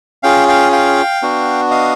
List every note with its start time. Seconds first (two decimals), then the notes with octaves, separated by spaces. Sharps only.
0.23 C#4 F4 G#4 F5 G5
0.48 F5 G5
0.72 F5 G5
1.22 B3 D4 F#4
1.71 D#5 F5